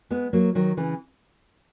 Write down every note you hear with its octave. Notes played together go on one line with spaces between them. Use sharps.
G#3 B3
F#3 A#3
D#3 F#3
C#3 E3